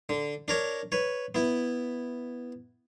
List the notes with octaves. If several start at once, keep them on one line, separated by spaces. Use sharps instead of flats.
D3
D4 A#4 C#5
B4 C#5
B3 E4